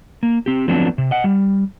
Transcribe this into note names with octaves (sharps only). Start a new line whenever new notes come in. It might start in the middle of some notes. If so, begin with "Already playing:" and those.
A#3
C4 G4
F3 F#3 A3 B3 C4 D4
C3
D#5 F#5
G3